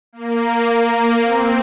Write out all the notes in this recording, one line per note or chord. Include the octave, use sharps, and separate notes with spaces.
A#3
A#3
C4